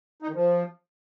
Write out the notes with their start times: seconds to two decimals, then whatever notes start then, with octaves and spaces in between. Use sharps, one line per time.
0.22 D#4
0.28 D#3
0.34 F3